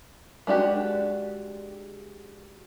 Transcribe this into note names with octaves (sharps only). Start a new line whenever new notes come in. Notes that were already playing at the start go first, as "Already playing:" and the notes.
G#3 D4 F#4 G4